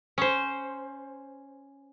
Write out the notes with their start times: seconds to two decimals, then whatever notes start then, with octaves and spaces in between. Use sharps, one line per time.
0.18 C#4 C5